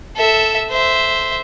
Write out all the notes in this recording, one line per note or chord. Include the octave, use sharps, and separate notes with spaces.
A4 E5
C5 E5